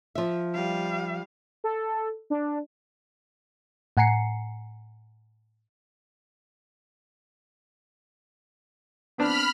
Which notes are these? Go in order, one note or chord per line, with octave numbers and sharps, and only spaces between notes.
F3 E5
G3 F5
A4
D4
A2 F#5 G#5 A#5 C7 C#7
B3 C4 D4 B5 F6